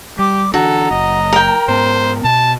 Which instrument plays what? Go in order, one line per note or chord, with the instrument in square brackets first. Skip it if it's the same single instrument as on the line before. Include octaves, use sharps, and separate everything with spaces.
[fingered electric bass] G3 [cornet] G4 [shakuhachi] D6
[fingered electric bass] D3 E3 D4 [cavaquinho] F#4 [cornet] A4 [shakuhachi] A#5
[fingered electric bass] F#1 [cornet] D#5
[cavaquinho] A#4 G5
[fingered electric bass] G#2 B3 C#4 [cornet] C5
[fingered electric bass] B2 [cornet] A5